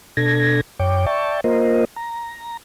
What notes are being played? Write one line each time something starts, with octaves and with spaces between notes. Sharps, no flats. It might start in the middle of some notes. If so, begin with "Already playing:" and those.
B2 D4 A4 G#6 A#6
F#2 C#5 G5 D6
D5 E5 G5 A5 C#6
A#3 F4 A#4 C5 D#5
A#5